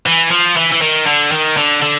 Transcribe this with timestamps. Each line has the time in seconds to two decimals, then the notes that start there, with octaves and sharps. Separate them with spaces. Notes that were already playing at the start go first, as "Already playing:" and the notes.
0.06 E3
0.31 F3
0.57 E3
0.72 E3
0.81 D#3
1.06 D3
1.32 D#3
1.57 D3
1.82 D3